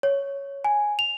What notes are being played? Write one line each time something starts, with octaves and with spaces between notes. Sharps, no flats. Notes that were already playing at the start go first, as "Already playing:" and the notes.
C#5
G#5
F7